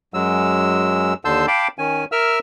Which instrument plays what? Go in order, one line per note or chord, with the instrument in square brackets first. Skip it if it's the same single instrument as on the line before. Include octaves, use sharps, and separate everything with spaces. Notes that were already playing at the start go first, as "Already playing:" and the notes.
[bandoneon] F#2 F#3 G#3 E6
D#2 D3 A5 C6 E6 G6
F5 G5 A5 B5 D6
D#3 C#4 G#5
A#4 E5 E6 F6